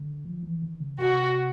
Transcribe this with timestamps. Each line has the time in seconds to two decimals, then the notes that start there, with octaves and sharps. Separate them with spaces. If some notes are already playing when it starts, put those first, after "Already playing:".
Already playing: D3
0.25 F3
0.43 E3
0.62 D#3
0.80 C#3
0.98 C3 F#4